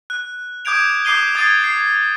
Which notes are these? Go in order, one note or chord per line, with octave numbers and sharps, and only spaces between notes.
F#6
D6 D#6 G6 G#6 D7 F7
D6 D#6 G6 C7 D#7 G7
D#6 G#6 A6 C7 D#7
C7